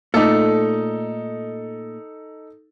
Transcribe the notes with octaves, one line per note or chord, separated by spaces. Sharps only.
A#2 A3 D#4 A4